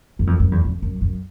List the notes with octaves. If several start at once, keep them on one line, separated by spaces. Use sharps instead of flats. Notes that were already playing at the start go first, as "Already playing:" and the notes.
F#2
F2
F#2
E2
F2
F#2
F#2